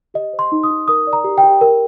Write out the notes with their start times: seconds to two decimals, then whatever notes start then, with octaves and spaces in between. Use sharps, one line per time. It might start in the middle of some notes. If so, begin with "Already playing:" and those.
0.14 G4 D#5
0.33 C5
0.39 C6
0.52 D#4
0.63 D#6
0.70 D#4
0.88 A#4 D#6
1.07 D5
1.13 A#5
1.24 G4
1.38 G5
1.43 G4
1.61 A#4